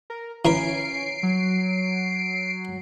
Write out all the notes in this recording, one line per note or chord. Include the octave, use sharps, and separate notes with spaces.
A#4
E3 C#4 A#4 B5 C7 D7
F#3